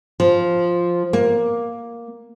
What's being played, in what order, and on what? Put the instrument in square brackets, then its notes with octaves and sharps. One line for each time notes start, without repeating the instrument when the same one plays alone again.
[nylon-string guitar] F3
A#3